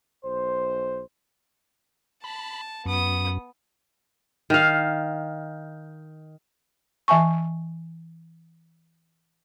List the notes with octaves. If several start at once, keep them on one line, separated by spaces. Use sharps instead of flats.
B1 C5
A5 B5
F#2 B3 D#6
D#3 F5
E3 E5 G#5 A5 C#6